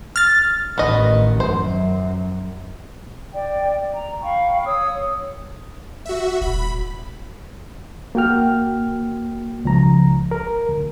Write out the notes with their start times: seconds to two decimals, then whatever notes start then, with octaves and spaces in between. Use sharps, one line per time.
0.16 F6 A6
0.78 A1 D#3 B3 D#5
1.40 F#2 C5
3.33 D5 G5
3.94 A#5
4.22 F5 G5 B5 C#6
4.65 C#5 D#6 E6
6.05 F#4 E5
6.41 D#1 B5
8.15 A#3 F#4 G5 F6
9.65 C#2 F3 A#5
10.31 A#4
10.69 D2